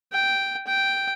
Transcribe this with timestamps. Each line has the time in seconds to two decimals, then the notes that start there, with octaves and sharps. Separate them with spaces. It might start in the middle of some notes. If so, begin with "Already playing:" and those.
0.12 G5
0.67 G5